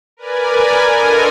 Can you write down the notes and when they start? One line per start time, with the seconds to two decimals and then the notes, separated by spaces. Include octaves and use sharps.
0.17 A#4 B4 D5 G#5
0.89 D4 F4 A4 A#4 D#5 G#5